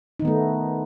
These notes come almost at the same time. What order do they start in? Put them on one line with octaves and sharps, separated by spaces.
D#4 D#3 B3 A3